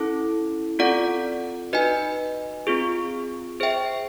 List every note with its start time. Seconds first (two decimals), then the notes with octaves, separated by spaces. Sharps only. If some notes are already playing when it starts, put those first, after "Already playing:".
Already playing: C#4 E4 A4
0.79 C4 F4 A4 D5 F#5
1.73 D#4 F#4 B4 D#5 G#5
2.67 C4 F4 G#4
3.60 G#4 C5 E5 G5